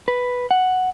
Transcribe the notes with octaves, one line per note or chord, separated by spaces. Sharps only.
B4
F#5